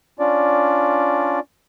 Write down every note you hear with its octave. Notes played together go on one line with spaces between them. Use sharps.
C#4 D4 F4 D5